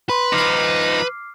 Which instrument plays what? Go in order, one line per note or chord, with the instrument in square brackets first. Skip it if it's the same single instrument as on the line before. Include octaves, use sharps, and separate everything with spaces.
[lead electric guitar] B4 [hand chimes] B5 C6
[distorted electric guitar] F3 D#4 [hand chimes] D6 F6 C7